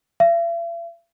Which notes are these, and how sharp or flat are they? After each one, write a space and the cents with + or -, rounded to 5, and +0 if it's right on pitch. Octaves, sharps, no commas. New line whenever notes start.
E5 +45